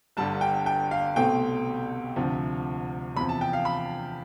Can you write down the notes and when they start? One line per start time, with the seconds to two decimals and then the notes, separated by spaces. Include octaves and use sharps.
0.17 G1 G2 D3 G3 A5
0.41 G5
0.66 G5
0.91 F5
1.16 C2 B2 A3 C4 G5
2.16 D2 C3 F3
3.16 E2 C3 F3 B5
3.29 A5
3.41 G5
3.53 F5
3.65 B5